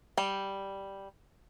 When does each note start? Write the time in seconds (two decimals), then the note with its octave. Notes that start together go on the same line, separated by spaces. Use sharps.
0.18 G3 G5